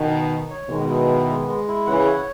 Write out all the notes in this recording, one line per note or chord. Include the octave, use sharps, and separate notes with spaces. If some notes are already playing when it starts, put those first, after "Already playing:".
Already playing: B2 D#3
D#4
D#4
C#5
B2 D#3 G#3
E4
B3
G#3
G#3
E4
C#3 E3 F#5
C#5